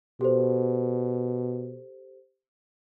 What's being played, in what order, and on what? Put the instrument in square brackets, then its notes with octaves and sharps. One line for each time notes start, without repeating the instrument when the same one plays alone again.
[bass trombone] B2 [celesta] G4 A4 C5